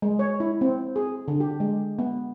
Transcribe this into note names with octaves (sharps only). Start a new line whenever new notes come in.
G#3
C#5
E4
C4
G#4
D3
G4
G#3
B3